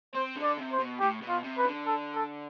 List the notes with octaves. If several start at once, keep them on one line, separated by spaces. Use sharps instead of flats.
C4 C5
D3
D5
C3
C5
B2
A2 G4
B2
F4
C3
B4
D3
A4
A4